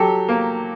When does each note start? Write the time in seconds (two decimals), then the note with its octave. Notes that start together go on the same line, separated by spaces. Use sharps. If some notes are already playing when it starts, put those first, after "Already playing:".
Already playing: F#3 G4 A4
0.29 A#3